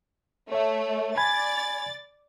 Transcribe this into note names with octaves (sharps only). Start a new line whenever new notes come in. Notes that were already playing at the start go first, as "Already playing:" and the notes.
A3 C#5 E5
D5 G#5 B5 G#6 A6